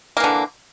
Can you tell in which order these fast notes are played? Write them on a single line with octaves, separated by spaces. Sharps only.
A#3 E3 D3